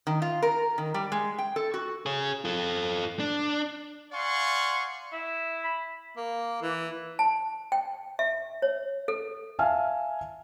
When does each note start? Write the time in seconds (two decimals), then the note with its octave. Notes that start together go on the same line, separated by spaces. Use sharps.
0.07 D#3
0.22 F4
0.43 A#4
0.78 D#3
0.94 G3
1.12 G#3
1.38 G5
1.56 A4
1.74 F#4
2.06 G#4 C#5
2.45 F4 A4
3.19 D4
4.12 D5 F5 F#5 G#5 C6 C#6
5.12 E4
5.64 B5
6.17 A#3
6.62 E3
7.19 A5
7.72 G5
8.19 E5
8.62 C#5
9.08 A4
9.59 E5 F5 G#5 A5 F6